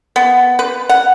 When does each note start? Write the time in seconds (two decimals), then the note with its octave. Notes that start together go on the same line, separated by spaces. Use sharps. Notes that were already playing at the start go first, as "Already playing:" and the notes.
0.16 B3
0.59 B4
0.89 F#5